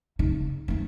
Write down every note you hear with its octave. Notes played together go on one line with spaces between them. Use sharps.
C#3 D#4
A3 D#4